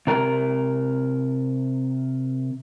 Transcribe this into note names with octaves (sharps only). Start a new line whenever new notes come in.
C3 A#4 G#5 A#5